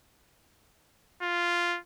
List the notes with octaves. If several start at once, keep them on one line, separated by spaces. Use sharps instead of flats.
F4